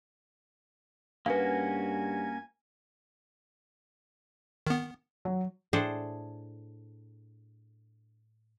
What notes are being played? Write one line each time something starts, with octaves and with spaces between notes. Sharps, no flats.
G2 A#3 C#4 F#4 B4 F5 G#5
D#3 B3
F#3
A2 D4 G#4 A4 C5